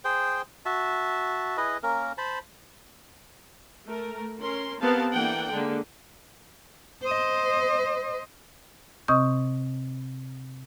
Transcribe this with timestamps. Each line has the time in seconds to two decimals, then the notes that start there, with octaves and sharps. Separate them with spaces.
0.04 G#4 C5 G5
0.66 F#4 E5 A5
1.57 E4 G#4 B4 D#5
1.83 A#3 C#4 A#4
2.18 C5 A5 B5
3.86 A3 A#4
4.39 C#4 A#4 C6
4.81 B3 C4 G4 A#4 F5 A5
5.12 E3 A#3 D4 A4 F#5 G5
5.52 D3 G#3 A#3
7.03 C5 D#5
9.08 C3 C4 D#5 C#6 D#6 G6